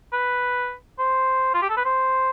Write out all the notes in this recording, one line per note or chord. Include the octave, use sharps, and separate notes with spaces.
B4
C5
F4
G4
A4
B4
C5